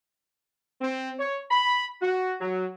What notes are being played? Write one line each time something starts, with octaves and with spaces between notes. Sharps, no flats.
C4
C#5
B5
F#4
F#3